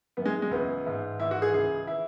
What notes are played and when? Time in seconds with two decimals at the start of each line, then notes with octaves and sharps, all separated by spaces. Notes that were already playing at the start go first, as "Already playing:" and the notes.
0.17 F#2 E3 B3
0.26 G#3
0.42 G#3
0.51 C#2 C#3 E3 B3
0.86 G#2 E3
1.20 G#2 E3 E4
1.31 F#4
1.42 G#4
1.54 C#2 C#3 E3 G#4
1.87 E3 E4